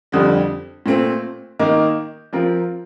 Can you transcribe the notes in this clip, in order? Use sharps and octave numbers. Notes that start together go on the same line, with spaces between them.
F2 D3 G3
A#2 A3 C4
D#3 A#3 D#4
F3 C4 F4 A#4